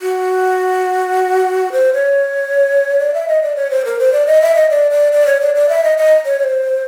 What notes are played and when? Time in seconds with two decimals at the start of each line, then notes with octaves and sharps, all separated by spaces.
0.02 F#4
1.72 C5
1.94 C#5
3.00 D5
3.14 E5
3.28 D#5
3.42 D5
3.56 C#5
3.70 C5
3.85 A#4
3.99 C5
4.13 D5
4.27 D#5
4.42 E5
4.56 D#5
4.70 D5
4.91 D5
5.13 D5
5.27 C#5
5.41 D5
5.55 D5
5.69 E5
5.84 D#5
5.98 D#5
6.25 C#5
6.39 C#5
6.44 C5